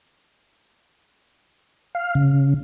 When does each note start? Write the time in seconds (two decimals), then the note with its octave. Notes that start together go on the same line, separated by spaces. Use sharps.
1.95 F5
2.15 C#3